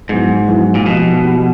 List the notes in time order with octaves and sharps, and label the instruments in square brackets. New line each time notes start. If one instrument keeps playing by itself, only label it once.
[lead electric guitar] G#2 [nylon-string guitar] F#3 B3 E4 G#4
[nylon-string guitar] F#3 B3 E4 G#4
[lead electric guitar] A#2
[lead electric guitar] B2 [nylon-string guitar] F3 A#3 D#4 G4
[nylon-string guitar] F3 A#3 D#4 G4